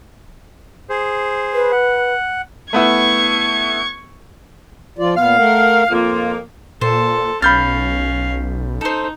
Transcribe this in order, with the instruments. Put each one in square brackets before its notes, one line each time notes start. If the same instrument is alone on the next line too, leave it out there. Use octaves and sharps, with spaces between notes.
[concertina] G#4 C5
[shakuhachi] B4
[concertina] F#5
[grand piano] A3 B3 E4 [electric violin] C#6 G#6
[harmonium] F3 F4 D5
[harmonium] A#2 B3 [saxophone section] F5
[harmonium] A3 A#4 F#5
[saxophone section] F2 A#3 [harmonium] F4
[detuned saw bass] A#2 [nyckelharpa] A4 A5 [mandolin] C5
[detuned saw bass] B1 [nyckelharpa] C#4 F5 [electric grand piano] B5 G6 A6 [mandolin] F6
[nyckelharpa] D#4 [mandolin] A4 C5